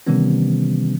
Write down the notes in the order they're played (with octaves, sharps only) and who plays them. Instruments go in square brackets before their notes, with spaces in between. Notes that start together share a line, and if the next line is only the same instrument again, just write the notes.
[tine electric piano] C3 D#3 E3 G3 B3 C#4